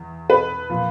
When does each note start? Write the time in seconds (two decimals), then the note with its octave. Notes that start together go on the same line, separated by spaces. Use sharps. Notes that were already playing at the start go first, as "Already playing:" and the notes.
Already playing: E2
0.30 B4
0.70 A#2 F3